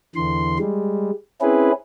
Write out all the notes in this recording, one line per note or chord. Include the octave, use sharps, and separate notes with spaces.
E2 D3 E3 C6
G3 G#3
C4 C#4 E4 G#4 B4